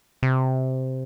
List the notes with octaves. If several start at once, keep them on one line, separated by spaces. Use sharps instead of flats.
C3